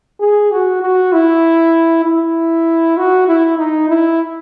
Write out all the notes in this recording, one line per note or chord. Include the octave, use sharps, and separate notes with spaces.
G#4
F#4
F#4
E4
E4
F#4
E4
D#4
E4